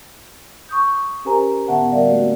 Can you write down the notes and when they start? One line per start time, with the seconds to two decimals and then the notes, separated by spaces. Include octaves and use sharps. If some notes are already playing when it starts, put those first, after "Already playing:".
0.69 C#6 D#6 G6
1.25 C#4 G4 A#4 C5 G#5 A#5
1.67 A2 D3 B3 E5 F#5 A5
1.92 G3 A#4 D5 E5 F5
2.08 A3 A#3 C#4 F#4